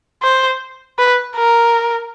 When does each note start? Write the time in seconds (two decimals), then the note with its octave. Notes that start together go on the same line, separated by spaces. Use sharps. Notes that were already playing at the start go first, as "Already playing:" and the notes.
0.23 C5
0.99 B4
1.36 A#4